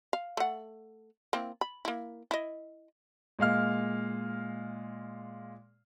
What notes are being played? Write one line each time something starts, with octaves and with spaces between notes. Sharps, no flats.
F5
A3 F#5
A#3 C4 E4
B5
A#3 E4
E4 D#5
A#2 G#3 F5 F6